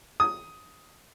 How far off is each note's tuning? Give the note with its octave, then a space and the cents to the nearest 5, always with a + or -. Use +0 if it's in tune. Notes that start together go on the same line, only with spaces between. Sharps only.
D#6 +10